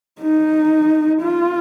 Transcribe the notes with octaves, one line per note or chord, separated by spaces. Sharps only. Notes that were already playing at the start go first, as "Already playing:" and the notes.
D#4
F4